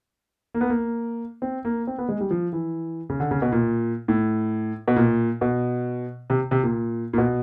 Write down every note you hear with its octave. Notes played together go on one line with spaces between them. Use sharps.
A#3
B3
A#3
C4
A#3
C4
B3
G#3
G3
F3
E3
C#3
D3
C#3
B2
A#2
A2
B2
A#2
B2
C3
C3
A#2
A#2
B2